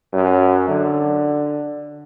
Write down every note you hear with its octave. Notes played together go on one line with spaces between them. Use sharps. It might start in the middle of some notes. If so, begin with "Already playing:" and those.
F#2
D3